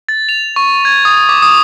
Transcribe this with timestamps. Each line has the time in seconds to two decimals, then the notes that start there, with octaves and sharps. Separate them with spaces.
0.09 A6
0.29 F7
0.56 C#6
0.85 G#6
1.05 D#6
1.29 D6
1.42 D#6